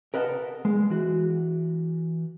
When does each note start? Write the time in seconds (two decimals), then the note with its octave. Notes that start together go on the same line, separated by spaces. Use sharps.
0.14 A#4 B4 D#5 E5 F#5 A5
0.65 G#3
0.90 E3 F#4